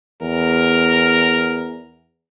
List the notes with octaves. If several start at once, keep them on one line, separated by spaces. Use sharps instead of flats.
E2 A#4